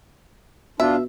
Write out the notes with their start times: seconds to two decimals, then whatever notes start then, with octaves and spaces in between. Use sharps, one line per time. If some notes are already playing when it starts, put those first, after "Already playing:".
0.80 B2 D4 F4 E5